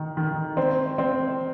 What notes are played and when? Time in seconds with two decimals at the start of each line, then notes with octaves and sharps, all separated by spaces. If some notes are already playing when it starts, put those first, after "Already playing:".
Already playing: D#3
0.17 D#3
0.57 C4
0.98 C4